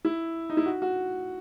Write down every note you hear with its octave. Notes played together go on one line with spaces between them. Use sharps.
E4
D#4
E4
F#4
F#4